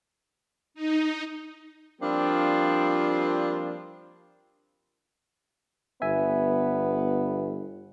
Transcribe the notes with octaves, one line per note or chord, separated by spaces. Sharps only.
D#4
F3 G3 A#3 C4 D4 F4
G1 B3 E5 G#5